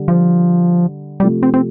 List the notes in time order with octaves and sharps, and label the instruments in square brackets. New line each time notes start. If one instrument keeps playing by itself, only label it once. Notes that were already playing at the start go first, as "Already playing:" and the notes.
Already playing: [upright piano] D3 G3
[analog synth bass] F3
[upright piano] C3 F3 A3 [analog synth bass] G3
[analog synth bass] C4
C4